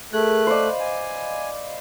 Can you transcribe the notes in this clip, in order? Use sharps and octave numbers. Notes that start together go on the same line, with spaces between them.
A3 G#4 A#4 F#6
C5 D5 D#5 F5 B5
G#5